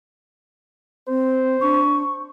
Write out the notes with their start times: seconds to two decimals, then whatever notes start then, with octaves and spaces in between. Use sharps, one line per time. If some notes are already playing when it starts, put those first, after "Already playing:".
1.08 C4 C5
1.61 D4 C#6